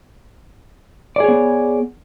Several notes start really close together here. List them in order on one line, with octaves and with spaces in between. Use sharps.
D5 G#4 C#5 B3